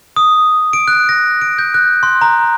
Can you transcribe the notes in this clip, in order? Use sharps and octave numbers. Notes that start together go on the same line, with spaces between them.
D#6
D7
F#6
A#6
D7
G6
F#6
C6
A#5